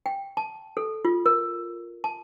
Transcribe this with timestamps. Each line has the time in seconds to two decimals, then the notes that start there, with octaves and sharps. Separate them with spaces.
0.06 G5
0.37 A5
0.77 A4
1.05 F4
1.26 A#4
2.04 A5